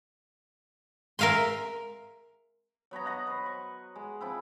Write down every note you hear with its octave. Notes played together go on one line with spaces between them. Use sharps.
A#4 E5 F5 G#5 C6
F#3 B3 C#5 A#5
D#5 F#5 A#5 C#6
B4 C5
C#6
G#3
F3 C4 E4